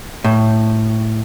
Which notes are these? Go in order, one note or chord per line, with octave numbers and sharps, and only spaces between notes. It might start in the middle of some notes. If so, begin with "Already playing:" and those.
A2